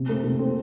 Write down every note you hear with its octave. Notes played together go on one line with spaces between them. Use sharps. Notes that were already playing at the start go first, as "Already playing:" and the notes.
Already playing: C3
A3 C4
C3
A3 C4